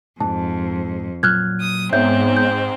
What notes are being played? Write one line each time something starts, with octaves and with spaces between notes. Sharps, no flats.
F2 G#2 A5
A#2 F#3 F6 F#6 G#6
D#6
G#2 B3 C4 C5 C#5 E5 G6
G6